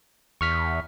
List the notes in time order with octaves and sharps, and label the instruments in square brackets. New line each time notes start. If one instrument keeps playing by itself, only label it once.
[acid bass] E2 [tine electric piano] C#6 F6 B6